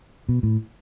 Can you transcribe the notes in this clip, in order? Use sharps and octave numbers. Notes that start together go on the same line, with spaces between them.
B2
A2